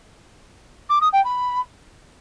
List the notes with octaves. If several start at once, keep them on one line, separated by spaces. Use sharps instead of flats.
D6
D#6
G5
B5